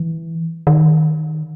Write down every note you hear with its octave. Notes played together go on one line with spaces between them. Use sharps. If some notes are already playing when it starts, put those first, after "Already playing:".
Already playing: E3
D#3